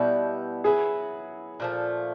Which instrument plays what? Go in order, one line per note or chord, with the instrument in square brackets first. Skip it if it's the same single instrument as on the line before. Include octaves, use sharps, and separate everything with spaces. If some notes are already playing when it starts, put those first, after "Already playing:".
Already playing: [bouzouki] B2 G3 B3 E4
[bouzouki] F#3 B3 E4 [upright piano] G#4
[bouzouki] A#2 F3 A3